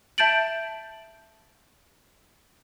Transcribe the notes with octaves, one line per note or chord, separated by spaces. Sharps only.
E5 A5 G6 A6 D7 F#7